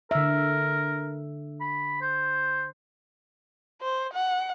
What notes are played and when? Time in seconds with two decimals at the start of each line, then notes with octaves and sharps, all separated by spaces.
0.11 D3 A#4 E5
1.61 B5
2.02 C5
3.81 C5
4.14 F#5